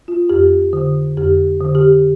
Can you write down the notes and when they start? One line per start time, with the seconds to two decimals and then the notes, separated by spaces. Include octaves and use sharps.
0.08 F4
0.29 F2 G4
0.73 D3
1.17 F2 G4
1.61 D3
1.75 G4